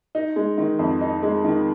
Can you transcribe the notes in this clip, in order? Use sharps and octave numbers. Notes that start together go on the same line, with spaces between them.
D#4
G#3
D#3
F2
D#4
G#3
D#3